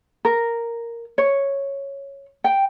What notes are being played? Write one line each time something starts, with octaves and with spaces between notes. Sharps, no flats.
A#4
C#5
G5